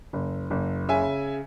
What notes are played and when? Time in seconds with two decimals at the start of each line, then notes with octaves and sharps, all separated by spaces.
0.13 F#1
0.50 F#1
0.89 C#3 E5 G#5